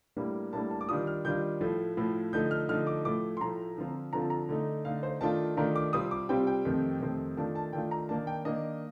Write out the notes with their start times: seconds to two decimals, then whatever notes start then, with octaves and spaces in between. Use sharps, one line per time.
0.17 A2 G3 A#3 D4
0.53 A2 G3 A#3 D4 A5
0.71 A5
0.81 D6
0.89 D#3 G3 D4 F4 D#6
1.07 F6
1.25 D#3 G3 D4 F4 G6
1.61 A2 F3 A3
1.97 A2 F3 A3
2.33 D3 F3 A3 D#4 G6
2.51 F6
2.69 D3 F3 A3 D#4 F6
2.87 D6
3.05 A2 F3 A3 D6
3.37 C6
3.40 A2 F3 A3 A#5
3.77 D3 F3 C4 F4
4.13 D3 F3 C4 F4 A#5
4.21 A5
4.30 A#5
4.49 D3 A3 D#4
4.85 D3 A3 D#4 F5
5.03 C5
5.21 D#3 A3 D4 F4 A5
5.57 D#3 A3 D4 F4 A#5
5.76 D6
5.93 C3 G3 C4 F4 D#6
6.11 D6
6.29 C3 G3 C4 F4 G5
6.47 G5
6.65 F2 C3 D#3 A3 C4
7.01 F2 C3 D#3 A3 C4
7.37 D#3 A3 D4 F4 A5
7.55 A5
7.73 D#3 A3 D4 F4 G5
7.91 A#5
8.09 D#3 A#3 D4 A5
8.27 G5
8.45 D#3 A#3 D4 D#5